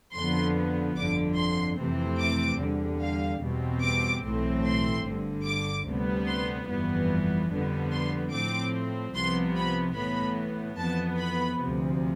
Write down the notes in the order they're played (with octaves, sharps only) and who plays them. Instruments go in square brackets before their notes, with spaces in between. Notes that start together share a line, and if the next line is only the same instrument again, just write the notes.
[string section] F2 D3 F3 B3 C6
G1 F2 D3 D6
C6
F2 C3 E3 A3 C4
D6
E2 D3 G3
F5
E2 B2 G3 C4
D6
B1 A2 E3 A3 C4
C6
G1 G2 D3
D6
D2 C3 G3 B3
C6
G1 F2 E3 G3 B3
F2 D3 G3 B3
C6
A2 F3 C4 D6
C2 C3 F3 B3 C6
B5
A2 E3 B3 B5
F2 E3 B3 A5
B5
D2 C3 F3